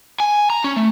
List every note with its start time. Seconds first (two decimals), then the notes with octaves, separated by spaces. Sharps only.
0.20 G#5
0.50 A#5
0.64 C#4
0.76 A3